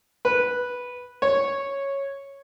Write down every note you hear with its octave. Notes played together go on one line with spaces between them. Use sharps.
B4
C#5